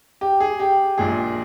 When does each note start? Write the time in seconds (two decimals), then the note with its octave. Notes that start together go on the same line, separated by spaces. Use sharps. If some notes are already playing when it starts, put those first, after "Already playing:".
0.21 G4
0.40 G#4
0.60 G4
0.98 A#1 A#2 G#3 G#4